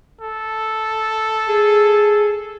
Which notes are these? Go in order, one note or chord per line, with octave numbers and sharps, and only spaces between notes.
A4
G#4